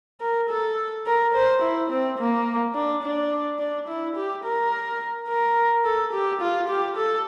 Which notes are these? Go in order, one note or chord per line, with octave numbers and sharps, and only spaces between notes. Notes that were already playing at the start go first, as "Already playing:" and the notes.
A#4
A4
A#4
C5
E4
C4
A#3
D4
D4
D4
E4
G4
A#4
A#4
A4
G4
F4
G4
A4